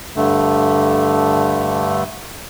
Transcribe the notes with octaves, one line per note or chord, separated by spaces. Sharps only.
G2 D3 A3